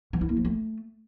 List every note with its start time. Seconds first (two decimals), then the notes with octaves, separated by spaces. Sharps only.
0.13 E3
0.21 E4
0.29 A#3
0.37 F3
0.45 A3